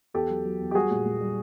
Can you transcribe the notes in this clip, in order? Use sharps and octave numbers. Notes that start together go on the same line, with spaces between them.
E2 G4 A4
F#3
F#3
E2
G4
G3 F#4 G#4
A#2
A#2
G3